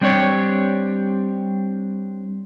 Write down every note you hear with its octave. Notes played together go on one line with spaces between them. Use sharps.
G3 C4 D4 G4 C#5